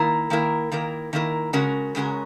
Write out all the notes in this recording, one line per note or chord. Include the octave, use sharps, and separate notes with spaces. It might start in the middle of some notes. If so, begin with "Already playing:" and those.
Already playing: D#3 A#3 E4 A#4
D#3 A#3 E4 A#4
D#3 A#3 E4 A#4
D#3 A#3 E4 A#4
C#3 G#3 C#4 F#4 A#4
C#3 G#3 C#4 F#4 A#4